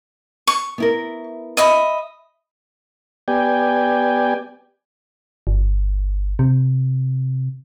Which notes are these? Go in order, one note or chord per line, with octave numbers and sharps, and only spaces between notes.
C#6
B3 E4 A#4
D#5 E5 B5
B3 G4 D5 G5 G#5
G1
C3